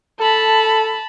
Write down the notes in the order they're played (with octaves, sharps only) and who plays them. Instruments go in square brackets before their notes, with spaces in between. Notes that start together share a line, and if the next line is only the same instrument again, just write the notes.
[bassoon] A4 [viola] A5 B5